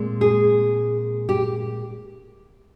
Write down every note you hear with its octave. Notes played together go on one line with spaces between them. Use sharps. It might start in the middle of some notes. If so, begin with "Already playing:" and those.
Already playing: A#2 G#3 C4
G#4
G4